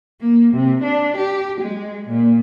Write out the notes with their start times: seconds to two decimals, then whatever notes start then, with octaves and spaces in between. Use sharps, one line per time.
0.21 A#3
0.54 C3
0.83 D4
1.17 G4
1.61 G#3
2.09 A#2